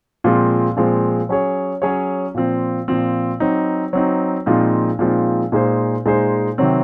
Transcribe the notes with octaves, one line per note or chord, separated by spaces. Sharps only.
A#2 F3 G#3 C4
A#2 F3 G#3 C4
F#3 C#4 G#4 C#5
F#3 C#4 G#4 C#5
A#2 F3 C4
A#2 F3 C4
F#3 C4 D#4
F#3 C4 D#4
A#2 F3 G#3 C4 D#4
A#2 F3 G#3 C4 D#4
A#2 G#3 D#4 G#4 C5
A#2 G#3 D#4 G#4 C5
C3 D#3 F#3 C4